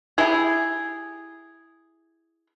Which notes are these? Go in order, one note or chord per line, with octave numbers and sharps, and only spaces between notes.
E4 G4 G#4